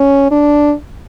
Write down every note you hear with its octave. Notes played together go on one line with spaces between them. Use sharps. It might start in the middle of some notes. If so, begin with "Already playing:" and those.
Already playing: C#4
D4